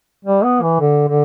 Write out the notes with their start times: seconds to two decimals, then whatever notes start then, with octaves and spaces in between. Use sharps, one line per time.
0.25 G3
0.44 B3
0.62 E3
0.80 D3
1.08 D3